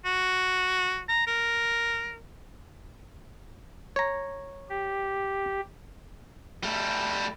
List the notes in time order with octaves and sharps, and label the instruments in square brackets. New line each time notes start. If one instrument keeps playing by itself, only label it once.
[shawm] F#4
A#5
A#4
[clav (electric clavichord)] C#5 A#5
[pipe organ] G4
[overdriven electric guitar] G3 A3